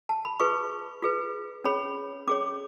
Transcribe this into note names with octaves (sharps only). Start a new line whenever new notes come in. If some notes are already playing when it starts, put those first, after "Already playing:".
A5
B5
F4 G#4 B4 C#6
F4 G#4 B4
C#4 G#4 C#5 B5
C#4 G#4 C#5 D6